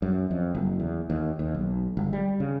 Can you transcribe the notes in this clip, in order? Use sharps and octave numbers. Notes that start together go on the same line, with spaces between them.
F#2
F2
F#1
E2
D#2
D#2
B1
G1
G3
C#3